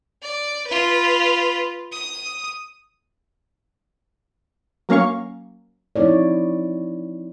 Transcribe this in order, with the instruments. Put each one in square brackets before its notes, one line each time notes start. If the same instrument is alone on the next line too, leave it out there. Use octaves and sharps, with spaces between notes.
[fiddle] D5
F4 B4
D#6
[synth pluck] F#3 A#3 C#4 F5 C#6
[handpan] F3 C4 D#4 E4 C#5 D5